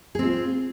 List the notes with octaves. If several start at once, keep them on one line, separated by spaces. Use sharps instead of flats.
C4 F4 G#4